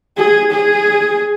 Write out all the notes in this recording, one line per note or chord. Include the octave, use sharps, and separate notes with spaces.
G#4
G#4